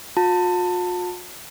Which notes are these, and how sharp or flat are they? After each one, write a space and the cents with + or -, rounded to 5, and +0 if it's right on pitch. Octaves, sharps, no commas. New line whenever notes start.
F4 +45 A5 +25